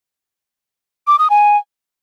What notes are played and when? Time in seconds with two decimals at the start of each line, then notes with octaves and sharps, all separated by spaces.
1.07 D6
1.19 D#6
1.30 G#5